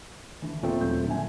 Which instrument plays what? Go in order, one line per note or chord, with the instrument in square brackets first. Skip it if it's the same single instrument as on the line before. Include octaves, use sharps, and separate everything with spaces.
[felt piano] D3 E3
[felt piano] E2 [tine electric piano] A#2 A3 C4
[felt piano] D#1 F#3 G6
D3 E5 G#5